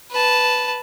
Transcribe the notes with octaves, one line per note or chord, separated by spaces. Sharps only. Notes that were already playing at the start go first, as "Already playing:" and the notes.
B4 A5